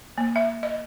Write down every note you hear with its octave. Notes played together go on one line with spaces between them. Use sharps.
A#3
E5
D#5